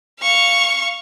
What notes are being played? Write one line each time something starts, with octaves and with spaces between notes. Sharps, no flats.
F5 C#6